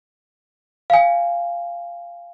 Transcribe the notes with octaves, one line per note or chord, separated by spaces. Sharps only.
F5 G#5